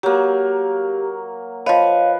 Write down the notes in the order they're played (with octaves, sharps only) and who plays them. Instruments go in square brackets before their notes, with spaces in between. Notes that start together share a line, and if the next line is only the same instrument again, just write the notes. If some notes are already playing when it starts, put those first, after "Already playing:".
[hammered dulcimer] F#3 A#3 [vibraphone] G4
[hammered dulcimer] F3 B4 [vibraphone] C#5 D#5 F5